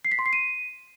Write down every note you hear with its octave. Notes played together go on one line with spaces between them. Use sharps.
C7
B6
C6
C7
D#7